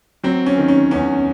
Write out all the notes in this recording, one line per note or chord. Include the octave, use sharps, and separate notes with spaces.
F#3 C4
C#4
D#3
C#4
E2 C#4